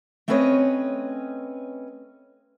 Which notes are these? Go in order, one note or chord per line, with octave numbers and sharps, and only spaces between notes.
A3 C4 C#4 B4 C#5 D#5